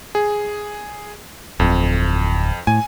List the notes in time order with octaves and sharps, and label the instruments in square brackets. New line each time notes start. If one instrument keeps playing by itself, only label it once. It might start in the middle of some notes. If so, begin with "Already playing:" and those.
[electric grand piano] G#4
[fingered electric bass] D1 [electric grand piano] F2
[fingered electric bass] A2 [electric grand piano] G#5